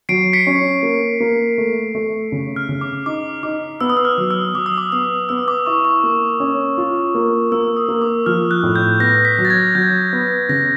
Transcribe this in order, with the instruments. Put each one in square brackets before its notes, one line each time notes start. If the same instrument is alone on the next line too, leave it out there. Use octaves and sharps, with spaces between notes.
[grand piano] F#3 [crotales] C7 D7
[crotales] B6 C#7
[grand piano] C#4
A#3
A#3
A3
A3
C#3
[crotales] F6
[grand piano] C#3
[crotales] D6
[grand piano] D#4 [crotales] D6
[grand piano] D#4 [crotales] D6
[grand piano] B3 [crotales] E6
[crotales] D#6
E6
F6
[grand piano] F#3
[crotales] E6
[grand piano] F#3 [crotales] D6
[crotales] D#6
D6
[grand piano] B3 [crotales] D#6
[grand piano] B3 [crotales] E6
[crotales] D6
[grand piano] E4 [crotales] C#6
[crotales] C#6
[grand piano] A#3
C#4
F4
A#3
[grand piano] A#3 [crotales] E6
[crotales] D#6
[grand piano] A#3
[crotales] D6
[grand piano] F3 [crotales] F6
[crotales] F#6
[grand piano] A2
[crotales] G6
[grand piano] B3 [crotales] A#6
[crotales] B6
[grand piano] F#3
[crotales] A6
G#6
[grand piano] F#3 [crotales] G6
[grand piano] B3
[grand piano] C#3 [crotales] A#6